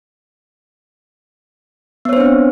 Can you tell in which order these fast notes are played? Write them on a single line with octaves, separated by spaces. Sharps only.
B3 C#5 C5 D4 C4